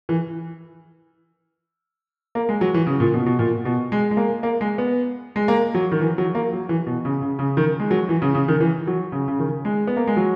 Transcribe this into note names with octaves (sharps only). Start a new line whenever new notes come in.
E3
A#3
G#3
F#3
E3
C#3
A#2
B2
B2
A#2
B2
G#3
G#3
A#3
A#3
G#3
B3
G#3
A#3
F#3
D#3
E3
F#3
A#3
F#3
E3
B2
C#3
C#3
C#3
D#3
G#3
F#3
E3
C#3
C#3
D#3
E3
F#3
C#3
C#3
D#3
G#3
B3
A#3
G#3
F#3